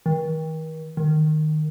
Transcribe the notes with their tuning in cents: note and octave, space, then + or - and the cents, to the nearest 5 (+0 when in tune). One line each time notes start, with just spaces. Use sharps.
D#3 +40
D#3 -15